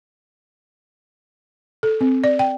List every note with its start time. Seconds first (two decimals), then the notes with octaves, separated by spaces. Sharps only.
1.83 A4
2.01 C4
2.24 D5
2.39 G5